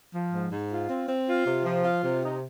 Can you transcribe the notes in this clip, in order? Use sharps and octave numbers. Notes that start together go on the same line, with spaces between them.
F3
G#2
G#2
F4
C4
C4
F4
C3
F3
F4
C3
D#4